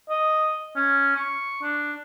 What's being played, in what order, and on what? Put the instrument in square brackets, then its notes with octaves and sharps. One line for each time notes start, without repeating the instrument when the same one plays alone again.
[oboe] D#5
C#4
C#6
D4